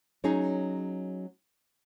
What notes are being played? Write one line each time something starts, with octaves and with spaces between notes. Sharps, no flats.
F#3 C#4 D#4 G#4